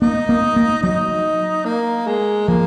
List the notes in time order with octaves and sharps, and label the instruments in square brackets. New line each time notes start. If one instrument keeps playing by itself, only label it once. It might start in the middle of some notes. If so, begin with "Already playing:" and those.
[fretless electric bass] A#3 [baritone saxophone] D#4
[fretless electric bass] A#3
A#3
[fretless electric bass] F#3 [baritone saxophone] D#4
[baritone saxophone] A#3
G#3
[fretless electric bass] F3 [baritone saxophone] A#3